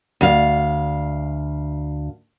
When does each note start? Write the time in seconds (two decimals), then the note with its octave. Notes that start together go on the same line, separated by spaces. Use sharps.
0.21 D2 F5